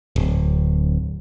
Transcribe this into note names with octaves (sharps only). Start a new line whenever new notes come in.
D1